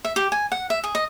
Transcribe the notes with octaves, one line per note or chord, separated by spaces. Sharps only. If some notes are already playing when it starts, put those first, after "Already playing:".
E5
G4
G#5
F#5
E5
G#4
D#5